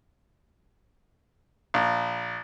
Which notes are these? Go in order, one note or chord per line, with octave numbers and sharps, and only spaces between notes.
A#1